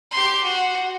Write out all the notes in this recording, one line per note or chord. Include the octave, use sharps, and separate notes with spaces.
G4 C6
F#4